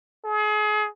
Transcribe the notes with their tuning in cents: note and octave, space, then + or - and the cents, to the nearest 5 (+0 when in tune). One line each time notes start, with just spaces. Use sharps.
G#4 +35